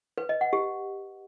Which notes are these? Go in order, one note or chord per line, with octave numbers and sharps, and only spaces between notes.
B4
D#5
F#5
G4